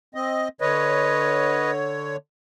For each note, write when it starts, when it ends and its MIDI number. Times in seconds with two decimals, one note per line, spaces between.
0.15 0.48 60
0.15 0.48 75
0.61 2.17 50
0.61 1.71 71
0.61 2.17 73
0.61 1.71 75